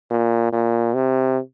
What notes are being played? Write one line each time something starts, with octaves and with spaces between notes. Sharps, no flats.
A#2
A#2
C3